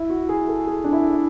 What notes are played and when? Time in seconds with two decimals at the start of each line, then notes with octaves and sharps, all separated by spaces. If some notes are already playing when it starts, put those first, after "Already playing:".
Already playing: E4
0.10 F#4
0.29 G#4
0.48 A4
0.67 G#4
0.84 D4
0.93 E4